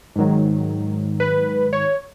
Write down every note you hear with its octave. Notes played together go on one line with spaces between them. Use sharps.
G#2 D#3 F#3
B4
C#5